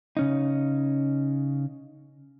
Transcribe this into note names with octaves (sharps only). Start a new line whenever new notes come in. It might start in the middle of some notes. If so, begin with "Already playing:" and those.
C#3 C#4 D#4